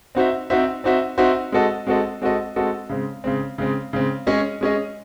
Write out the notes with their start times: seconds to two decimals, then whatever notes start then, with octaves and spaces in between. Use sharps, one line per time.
0.15 C4 D#4 F#4 C5 E5
0.50 C4 D#4 F#4 C5 E5
0.84 C4 D#4 F#4 C5 E5
1.18 C4 D#4 F#4 C5 E5
1.52 G#3 C4 F#4 A4 D#5
1.87 G#3 C4 F#4 A4 D#5
2.22 G#3 C4 F#4 A4 D#5
2.56 G#3 C4 F#4 A4 D#5
2.89 C#3 G#3 C4
3.24 C#3 G#3 C4
3.58 C#3 G#3 C4
3.93 C#3 G#3 C4
4.27 G#3 C#4 G#4 D#5
4.61 G#3 C#4 G#4 D#5